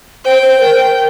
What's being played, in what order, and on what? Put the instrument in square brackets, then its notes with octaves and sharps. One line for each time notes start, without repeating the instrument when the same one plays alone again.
[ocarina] C5 [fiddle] G5
[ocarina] C5
A#4